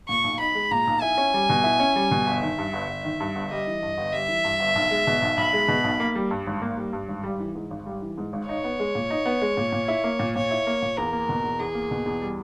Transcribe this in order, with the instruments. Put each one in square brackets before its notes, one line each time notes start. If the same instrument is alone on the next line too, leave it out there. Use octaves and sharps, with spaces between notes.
[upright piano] A#2 [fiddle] C#6
[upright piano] B1
[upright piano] D#4 [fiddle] B5
[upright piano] G#3
[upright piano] A#2 [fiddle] A#5
[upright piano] B1
[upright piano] E4 [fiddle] G#5
[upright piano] C#4
G3
B2
E4
C#4
G3
B2
[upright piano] G1 [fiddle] E5
[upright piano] D#3
G2
G1
G1
D#3
G2
G1
[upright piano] G3 [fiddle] D#5
[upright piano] E3
G2
G1
[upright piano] G3 [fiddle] E5
[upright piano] E3
G2
G1
B1
G#3
B2
B1
[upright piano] B1 [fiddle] B5
[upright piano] G#3
B2
B1
A#3
G3
G2
G#1
A#3
G3
G2
G#1
G3
E3
G#2
G#1
G3
E3
G#2
G#1
[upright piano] D#4 [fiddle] C#5
[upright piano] B3
G#3
A#2
D#4
B3
G#3
A#2
A#2
E4
A#3
A#2
[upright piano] A#2 [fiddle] C#5
[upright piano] E4
A#3
A#2
[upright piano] E2 [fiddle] A#4
[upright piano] A#3
B2
E2
[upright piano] E2 [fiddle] G#4
[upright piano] A#3
B2
E2
G3